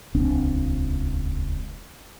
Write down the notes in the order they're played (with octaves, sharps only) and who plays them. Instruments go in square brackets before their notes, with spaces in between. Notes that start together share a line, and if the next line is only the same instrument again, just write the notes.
[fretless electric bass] D#1 C#2 C4 D4